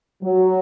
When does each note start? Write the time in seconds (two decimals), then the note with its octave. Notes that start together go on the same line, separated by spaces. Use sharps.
0.23 F#3